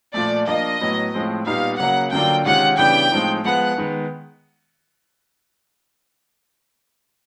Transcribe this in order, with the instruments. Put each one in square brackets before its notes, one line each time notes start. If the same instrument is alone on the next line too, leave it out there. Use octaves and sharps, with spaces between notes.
[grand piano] A#2 F3 A3 [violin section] D5
[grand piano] F3 A#3 D4 F4 [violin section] D#5
[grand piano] A2 F#3 B3
A2 F3 G#3 C4
[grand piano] A#2 G3 B3 D#4 [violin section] F5
[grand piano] C#3 F#3 A#3 [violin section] F#5
[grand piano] D3 F#3 A#3 D4 F4 [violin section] G5
[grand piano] C3 D#3 G#3 C#4 F4 [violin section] F#5
[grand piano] C#3 E3 G3 B3 D4 [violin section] G5
[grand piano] A2 F3 G#3 C4 D#4
[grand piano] F3 G#3 B3 [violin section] F#5
[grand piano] D#3 G#3 B3